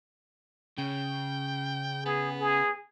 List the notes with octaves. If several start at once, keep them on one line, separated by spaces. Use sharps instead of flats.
C#3 G5
B3 G#4
G#4